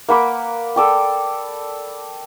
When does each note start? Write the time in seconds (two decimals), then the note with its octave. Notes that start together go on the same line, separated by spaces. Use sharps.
0.09 A#3 F#5 B5 D6
0.76 A4 D5 G5